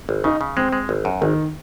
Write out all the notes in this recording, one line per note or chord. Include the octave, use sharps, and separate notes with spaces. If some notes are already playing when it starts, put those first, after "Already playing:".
G#1
C#3 D#4
C#3
G#3 C4
G#3
G#1
F#2
G#1 D#3